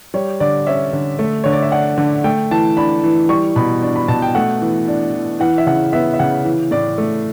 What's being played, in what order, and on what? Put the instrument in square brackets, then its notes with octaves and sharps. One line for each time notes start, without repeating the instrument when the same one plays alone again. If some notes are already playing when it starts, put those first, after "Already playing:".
[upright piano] G3 C#5
D3 D5
C#4 E5
D3
A3
D3 C#5
D5
E5
D4 F#5
D3
A3 G5
E3 A5
D4 B5
E3
G3 C#6
B2 B5
D4
B5
B2 A5
G5
A3 F#5
E3
D4
E3
E3 F#5
E5
C#3 F#5
B3 E5
E5
C#3 F#5
E3
A2 D5
A3